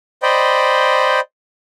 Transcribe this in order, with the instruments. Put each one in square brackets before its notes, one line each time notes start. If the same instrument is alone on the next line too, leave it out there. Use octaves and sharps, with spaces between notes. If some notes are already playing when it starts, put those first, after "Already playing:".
[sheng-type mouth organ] C5 D5 D#5 G5 B5